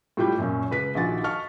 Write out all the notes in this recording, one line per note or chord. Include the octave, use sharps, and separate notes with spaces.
A2 G3 F4 G4 B5 G6
F#2 A#2 C#4
C#2 B4 B6
A#1 D#3 F#4 A6
D#5 F5 A5 C#6 F6